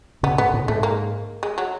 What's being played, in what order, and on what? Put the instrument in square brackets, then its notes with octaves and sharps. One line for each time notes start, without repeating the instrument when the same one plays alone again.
[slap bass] C#3 [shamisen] B3
[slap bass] G#2 [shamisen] B3
[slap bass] A2
[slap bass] G#2 [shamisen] A3
[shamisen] A#3
G#3
F#3